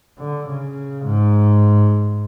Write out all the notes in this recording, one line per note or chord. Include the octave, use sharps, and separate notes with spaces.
D3
C#3
G#2